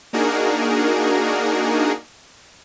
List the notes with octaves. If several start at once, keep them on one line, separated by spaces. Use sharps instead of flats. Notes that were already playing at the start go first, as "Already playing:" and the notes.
A#3 D4 D#4 F#4 G#4 A#4